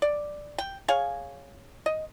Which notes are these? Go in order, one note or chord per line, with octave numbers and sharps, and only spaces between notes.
D5
G5
G#4 C#5 F5 G#5
D#5